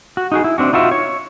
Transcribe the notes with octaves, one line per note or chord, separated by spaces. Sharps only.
F#4
D#4 F#4 G#4
E4
C4 D4 F#4
D#4 F4 F#4 E5
C#5